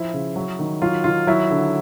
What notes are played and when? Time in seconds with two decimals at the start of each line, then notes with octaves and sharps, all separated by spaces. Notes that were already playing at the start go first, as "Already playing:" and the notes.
Already playing: F3 E4
0.14 C#3
0.36 F#3
0.59 D#3
0.82 F#3 F4
1.04 D#3 F4
1.27 F#3 E4
1.50 D3